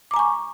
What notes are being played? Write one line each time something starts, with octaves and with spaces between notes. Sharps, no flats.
G#5 A#5 C#6 D6